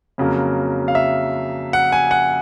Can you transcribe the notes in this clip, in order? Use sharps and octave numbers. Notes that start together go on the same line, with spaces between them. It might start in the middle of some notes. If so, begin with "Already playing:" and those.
F2 C#3 F#3 A#3
F5
E5
F#5
G#5
F#5